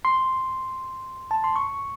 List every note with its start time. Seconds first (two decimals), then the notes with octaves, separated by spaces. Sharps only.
0.05 C6
1.31 A5
1.44 C6
1.56 C#6